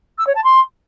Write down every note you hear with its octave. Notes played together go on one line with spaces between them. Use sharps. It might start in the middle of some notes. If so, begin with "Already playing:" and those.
E6
C#5
A5
C6